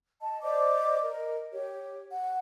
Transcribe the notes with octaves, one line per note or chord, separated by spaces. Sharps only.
D#5 A5
C5 D5 D#5 D6
A#4 D#5
G4 C#5
F#5